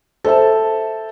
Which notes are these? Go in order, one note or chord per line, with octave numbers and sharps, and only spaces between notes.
A4 C5 E5 A5